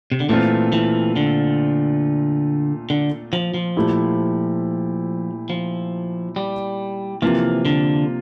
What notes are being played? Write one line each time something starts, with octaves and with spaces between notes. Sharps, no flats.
C3
D3
A#2 E3 A3 C4 F4
E3
D3
D3
F3
F3
A#2 A3 E4 G4
F3
G3
C3 E3 F3 A#3 F4
D3